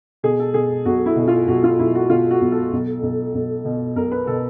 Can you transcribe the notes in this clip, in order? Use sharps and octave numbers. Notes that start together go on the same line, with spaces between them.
B2 G#4
A4
B2 G#4
B1 F#4
E4
B2
F4
B1 F#4
F4
B1 E4
F#4
B2 F4
F#4
B1
A4
B1
B1
B1
B2
B1 A#4
B4
B2 A4